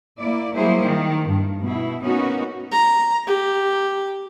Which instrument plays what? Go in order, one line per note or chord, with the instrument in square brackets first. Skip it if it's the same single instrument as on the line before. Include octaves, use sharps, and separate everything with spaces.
[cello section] A#3 E4 D5
F#3 G3 A#3 E4 G#4 C5
D#3
G2
B2 E4
A#3 B3 C#4 D#4 F#4
[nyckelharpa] A#5
G4